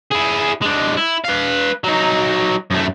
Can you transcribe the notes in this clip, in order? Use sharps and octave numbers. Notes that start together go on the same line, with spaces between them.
E4 G#4
G#3 D4
E4
B4 F5
F#3 D#4
F#2 A3